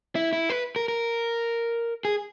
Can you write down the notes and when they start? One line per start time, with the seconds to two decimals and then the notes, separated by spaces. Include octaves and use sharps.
0.15 E4
0.33 E4
0.50 B4
0.76 A#4
0.88 A#4
2.05 G#4